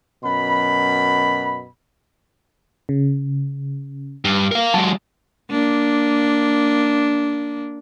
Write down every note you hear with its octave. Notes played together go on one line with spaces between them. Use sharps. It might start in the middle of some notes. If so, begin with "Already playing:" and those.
F#2 B2 B5
C#3
G2
A#4 F5
F#3 G#3 A5
A#3 D4